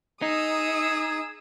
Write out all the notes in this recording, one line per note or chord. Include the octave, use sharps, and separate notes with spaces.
D#4 G#4 D#6 E6